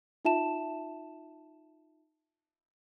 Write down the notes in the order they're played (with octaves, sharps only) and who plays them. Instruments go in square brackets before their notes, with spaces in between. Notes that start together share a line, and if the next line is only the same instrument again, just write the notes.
[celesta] D#4 F4 E5 A5 E7